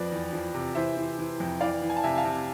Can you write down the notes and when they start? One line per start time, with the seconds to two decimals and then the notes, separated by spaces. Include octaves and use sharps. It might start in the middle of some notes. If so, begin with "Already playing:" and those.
Already playing: F2 F3 B4 D5
0.12 E2
0.33 F3
0.54 C3
0.75 E3 C5 E5
0.97 E3
1.19 E3
1.40 F2
1.61 E3 D5 F5
1.82 E3
1.90 G#5
1.97 A5
2.04 C3 E5 G#5
2.18 F5 A5
2.25 C3